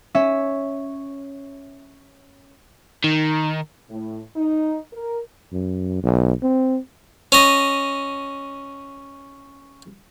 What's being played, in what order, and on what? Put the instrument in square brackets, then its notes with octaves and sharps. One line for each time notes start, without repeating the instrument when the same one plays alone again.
[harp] C#4 E5
[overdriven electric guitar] D#3
[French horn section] A2
D#4
A#4
[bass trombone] F#2
B1
C4
[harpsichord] C#4 D#5